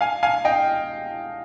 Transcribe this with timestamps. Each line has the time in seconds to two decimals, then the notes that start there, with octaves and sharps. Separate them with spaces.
0.01 F5 G#5
0.23 F5 G#5
0.45 D#5 G5